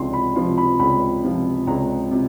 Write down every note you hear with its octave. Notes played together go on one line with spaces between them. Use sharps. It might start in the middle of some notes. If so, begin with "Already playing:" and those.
Already playing: C#2 C3 F3 C6
B5
C3 F3 C6
B5
C#2 B5
C3 F3
C#2 A#5
C3